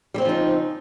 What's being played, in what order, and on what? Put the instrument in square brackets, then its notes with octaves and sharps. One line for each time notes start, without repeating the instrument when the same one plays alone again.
[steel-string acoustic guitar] G3
C4
C#3
F3
D#4